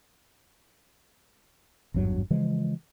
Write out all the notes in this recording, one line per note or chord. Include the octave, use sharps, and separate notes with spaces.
G#1 E2 G2 F#3
C#3 E3 F3 G#3